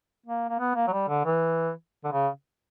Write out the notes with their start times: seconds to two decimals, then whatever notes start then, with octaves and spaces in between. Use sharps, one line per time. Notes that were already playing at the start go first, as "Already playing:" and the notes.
0.26 A#3
0.49 A#3
0.59 B3
0.75 A#3
0.87 F#3
0.92 G3
1.09 D3
1.25 E3
2.04 D3
2.12 C#3